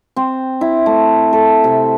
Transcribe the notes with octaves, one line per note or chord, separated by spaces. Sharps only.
C4
E4
A3
A4
C3